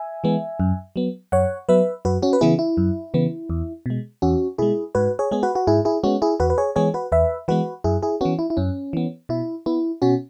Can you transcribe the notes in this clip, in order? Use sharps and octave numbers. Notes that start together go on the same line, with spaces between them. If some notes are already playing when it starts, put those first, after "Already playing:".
Already playing: E5 G#5
E3 G#3 B3
F#2
F#3 B3
F#2 C#5 F#5
F#3 B3 B4 E5
F#2 F#4 B4
C#4 F#4
B4
C#3 E3 B3 E4 G#4
E4
F#2
C#3 E3 B3
E2
B2 G#3
E2 C#4 F#4
B2 G#3 E4 G#4
G#2 F#4 B4
G#4 C#5
G#3 B3 G#4
F#4 B4
F#4
G#2 E4 G#4
E4 G#4
G#3 B3 C#4 F#4
E4 G#4
E2 F#4 B4
B4
G#4 C#5
E3 G#3 B3 G#4 C#5
F#4 B4
E2 B4 E5
E3 G#3 B3 F#4 B4
F#2 E4 G#4
E4 G#4
E3 B3 C#4 F#4
E4
E4
F#2 C#4
E3 B3
B2 E4
B3 E4
B2 C#4 F#4